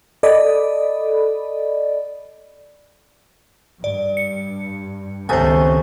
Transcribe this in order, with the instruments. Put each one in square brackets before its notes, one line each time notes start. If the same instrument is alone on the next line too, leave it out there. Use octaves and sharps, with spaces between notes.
[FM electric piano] A4 D5 D#5 B5
[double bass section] G2 [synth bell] D5
[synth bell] C#7
[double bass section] C#2 D#3 C#4 [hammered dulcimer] C3 A3 B3 [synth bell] C5 G#5